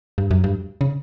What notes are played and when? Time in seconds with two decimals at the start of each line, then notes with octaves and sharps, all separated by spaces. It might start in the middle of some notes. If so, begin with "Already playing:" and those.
0.18 G2
0.31 F#2
0.44 G2
0.81 C#3